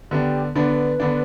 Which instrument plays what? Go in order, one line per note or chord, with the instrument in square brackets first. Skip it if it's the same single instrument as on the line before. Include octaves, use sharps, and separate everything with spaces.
[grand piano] D3 B3 D4 [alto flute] G4
[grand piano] D3 B3 D4 [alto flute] B4
[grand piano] D3 B3 D4